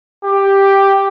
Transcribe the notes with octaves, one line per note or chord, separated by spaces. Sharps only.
G4